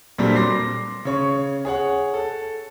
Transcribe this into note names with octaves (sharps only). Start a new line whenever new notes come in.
A#2 F#3 G3 A3 C4 D4
C6 D6 A#6 C7
C#3 C#5 C#6
G#4 C#5 F#5
A4